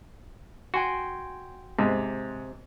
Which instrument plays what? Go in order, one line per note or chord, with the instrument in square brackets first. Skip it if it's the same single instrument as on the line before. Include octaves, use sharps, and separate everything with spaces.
[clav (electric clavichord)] F#4 [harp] G5 G#5 C6
[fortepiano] G#2 [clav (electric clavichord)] C3